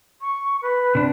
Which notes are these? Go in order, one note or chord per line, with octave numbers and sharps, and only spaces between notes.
C#6
B4
C3 D4